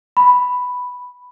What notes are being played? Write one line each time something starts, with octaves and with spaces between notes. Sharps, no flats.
B5